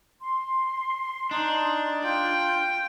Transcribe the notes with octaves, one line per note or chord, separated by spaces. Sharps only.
C6
D4 D#4
F4 G5 G6